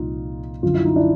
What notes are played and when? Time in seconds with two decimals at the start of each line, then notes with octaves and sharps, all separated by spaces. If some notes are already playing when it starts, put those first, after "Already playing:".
Already playing: C2 A#2 F3 D#4 F4
0.63 F#2 D3 F3 F4
0.74 E4
0.85 D#4
0.96 D4 E4